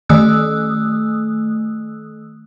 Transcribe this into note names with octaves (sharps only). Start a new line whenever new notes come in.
D#3 A3 D#6 E6 F#6